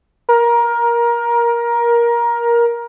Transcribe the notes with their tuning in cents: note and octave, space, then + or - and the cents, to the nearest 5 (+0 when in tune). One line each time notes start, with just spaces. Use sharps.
A#4 +20